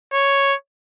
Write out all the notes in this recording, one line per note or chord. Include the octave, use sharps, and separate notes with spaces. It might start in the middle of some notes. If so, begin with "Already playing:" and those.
C#5